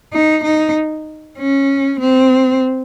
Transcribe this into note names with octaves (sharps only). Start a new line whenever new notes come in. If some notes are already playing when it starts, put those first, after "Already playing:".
D#4
D#4
C#4
C4